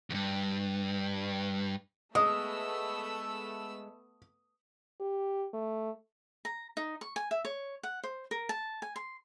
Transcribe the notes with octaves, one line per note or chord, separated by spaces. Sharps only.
E2 G2
G#3 A3 B3 D#6 E6
G4
A3
A#5
D#4
C#6
G#5
E5
C#5
F#5
C5
A#4
A5
G#5
C6